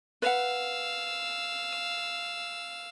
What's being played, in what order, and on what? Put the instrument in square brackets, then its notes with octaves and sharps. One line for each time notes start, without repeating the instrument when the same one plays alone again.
[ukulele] B4 F#5 [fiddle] F5 E6